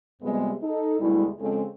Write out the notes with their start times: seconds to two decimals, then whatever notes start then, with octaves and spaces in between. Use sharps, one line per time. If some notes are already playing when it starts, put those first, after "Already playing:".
0.22 F2 C3 G3 G#3 B3
0.62 D#4 A4
1.00 D2 B2 G3 G#3 E4
1.40 F2 C#3 G#3 C4 A4